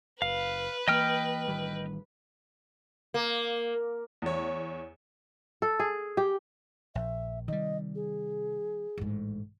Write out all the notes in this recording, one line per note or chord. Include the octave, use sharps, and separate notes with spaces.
F#1 B4 F5
E3 A#3 D#5 G5 F6
A1 D#3 G3
A#3
E2 C#5
A4
G#4
G4
A#1 E5
C3 D#3 G3 D#5
G#4
A1 G#2